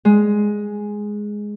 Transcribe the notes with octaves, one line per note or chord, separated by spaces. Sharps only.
G#3